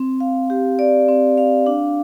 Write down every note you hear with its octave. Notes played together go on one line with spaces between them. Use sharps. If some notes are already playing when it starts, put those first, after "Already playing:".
Already playing: C4
F5
G4
D5
C4
F5
D4